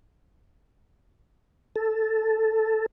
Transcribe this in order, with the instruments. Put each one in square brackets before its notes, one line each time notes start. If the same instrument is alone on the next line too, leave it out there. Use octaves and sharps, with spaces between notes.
[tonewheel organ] A4